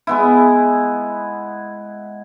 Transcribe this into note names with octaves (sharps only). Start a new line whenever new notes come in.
G#3 B3 E4